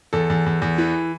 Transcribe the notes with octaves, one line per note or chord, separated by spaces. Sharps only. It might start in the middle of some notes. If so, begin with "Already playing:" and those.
E2 A4
E2
E2
E2
E3